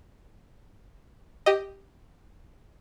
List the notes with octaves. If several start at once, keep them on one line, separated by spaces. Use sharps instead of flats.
G4 D#5